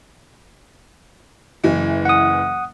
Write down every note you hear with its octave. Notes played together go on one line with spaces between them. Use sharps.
F#1 E3
F#5 D#6